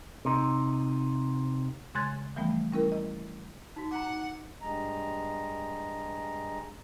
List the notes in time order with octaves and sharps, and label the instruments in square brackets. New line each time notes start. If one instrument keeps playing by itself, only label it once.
[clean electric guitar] C3 D#4
[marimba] C#3 G#3 C6 F#6 G#6 A6
E3 F3 G3 A3 B3
G3 C#4 E4 A#4
D#5
[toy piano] D#4 F#4
[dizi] F#5 [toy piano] A#5 D6
[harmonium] G2 G#3 A#5